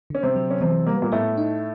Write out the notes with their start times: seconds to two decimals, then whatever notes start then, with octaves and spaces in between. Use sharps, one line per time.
0.10 D3 C#4
0.23 C3 C4
0.36 F#3
0.50 C#4
0.61 C3 E3 C4
0.86 G3 A#3
0.95 B3
1.02 A#2 A#3
1.12 A2 A3 B3
1.37 D#4